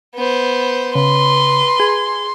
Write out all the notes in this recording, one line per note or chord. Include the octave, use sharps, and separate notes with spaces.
B3 C5
C#3 B4 C6
G#4